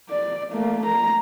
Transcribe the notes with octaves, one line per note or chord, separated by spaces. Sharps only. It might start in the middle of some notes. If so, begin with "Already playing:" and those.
D5
A3 A#3
A#5